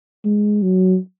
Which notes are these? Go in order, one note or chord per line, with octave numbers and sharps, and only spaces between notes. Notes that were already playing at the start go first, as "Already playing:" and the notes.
G#3
F#3